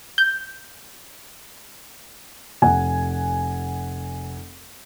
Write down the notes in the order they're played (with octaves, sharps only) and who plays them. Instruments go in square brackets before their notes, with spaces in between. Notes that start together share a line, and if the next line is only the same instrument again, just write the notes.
[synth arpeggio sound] G6
[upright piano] F1 F#5 G#5